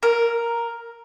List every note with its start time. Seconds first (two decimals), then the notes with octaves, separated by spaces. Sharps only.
0.03 A#4